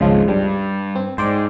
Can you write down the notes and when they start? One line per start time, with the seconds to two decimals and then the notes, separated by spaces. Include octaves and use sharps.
0.01 G#1 C#2 C#3 F3 G#3
0.28 G2 G3
0.95 C4
1.18 G#2 C5 D5 G5